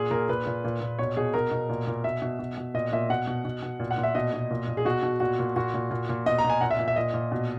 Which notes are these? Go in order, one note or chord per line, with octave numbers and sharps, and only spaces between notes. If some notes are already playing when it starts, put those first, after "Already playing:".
Already playing: A#2 G#4
A#2 A#4
A#2 B4
A#2
A#2
A#2
B2 C#5
B2 G#4
B2 A#4
B2
A#2
A#2
B2 E5
B2
B2
B2
A#2 D#5
A#2 E5
B2 F#5
B2
B2
B2
A#2
F#5
A#2
E5
B2 D#5
B2
A#2
A#2
G#4
B2 F#4
B2
A#2 F#4
A#2
A#2 F#4
A#2
A#2
A#2
B2 D#5
A#5
B2
G#5
A#2 F#5
E5
A#2
E5
A#2 D#5
A#2
B2